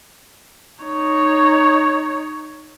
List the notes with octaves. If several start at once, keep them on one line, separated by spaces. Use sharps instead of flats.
D#4 C#5